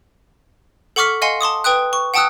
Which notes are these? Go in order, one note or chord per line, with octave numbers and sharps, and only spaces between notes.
A4 F#5 C#6 D6 F6 B6
D#5 F5 F#5 G#5 C6
A5 C6 D6 D#6
B4 G5 D#6 F#6
C#6
F#5 G5 A5 D#6 E6 F#6